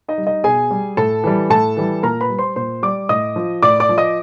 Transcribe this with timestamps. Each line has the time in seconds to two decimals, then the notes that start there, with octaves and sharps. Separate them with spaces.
0.08 D#4 D#5
0.18 G3
0.27 D#4 D#5
0.44 B2 G#4 G#5
0.71 G3
0.97 A2 A4 A5
1.24 E3 G3
1.50 A2 A4 A5
1.77 E3 G3
2.03 A#2 A#4 A#5
2.21 B4 B5
2.30 G3
2.39 C5 C6
2.56 A#2 C5 C6
2.83 G3 D5 D6
3.09 A2 D#5 D#6
3.36 F3
3.62 A2 D5 D6
3.80 D5 D6
3.89 F3
3.98 D#5 D#6